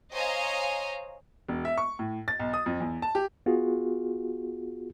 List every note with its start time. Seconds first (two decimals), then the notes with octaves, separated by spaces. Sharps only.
0.14 C5 C#5 D#5 F5 G#5 A#5
1.49 E1
1.65 E5
1.78 C#6
1.99 A2
2.28 A6
2.39 B1
2.54 D#6
2.66 F2
2.80 E2
3.02 A5
3.15 G4
3.46 B3 F4 F#4 G#4